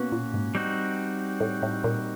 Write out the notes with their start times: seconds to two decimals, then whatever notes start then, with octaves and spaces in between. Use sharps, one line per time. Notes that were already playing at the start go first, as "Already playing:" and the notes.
Already playing: B2 A#3 C#4 F#4
0.12 A#2
0.34 G#2
0.55 G3 C4 D#4 F#4
1.40 A2
1.62 A2
1.84 A#2